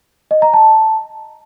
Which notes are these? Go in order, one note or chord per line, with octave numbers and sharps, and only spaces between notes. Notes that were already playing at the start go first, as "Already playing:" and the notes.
D#5
A#5
A5